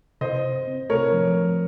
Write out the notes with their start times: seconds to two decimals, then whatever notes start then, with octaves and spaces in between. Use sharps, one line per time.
0.21 C3 C5 D#5
0.44 C3
0.67 C4
0.90 A3 A#4 C#5
1.13 F3